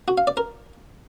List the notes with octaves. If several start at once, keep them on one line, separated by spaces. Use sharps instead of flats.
F#4
F5
D5
A#4